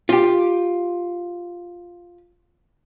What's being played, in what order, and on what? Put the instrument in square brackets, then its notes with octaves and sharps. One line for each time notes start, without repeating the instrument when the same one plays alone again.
[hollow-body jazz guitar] F4 G4